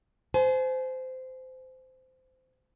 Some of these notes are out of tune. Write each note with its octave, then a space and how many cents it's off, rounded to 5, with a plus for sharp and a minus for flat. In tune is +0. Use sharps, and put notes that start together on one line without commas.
C5 -20 G#5 +35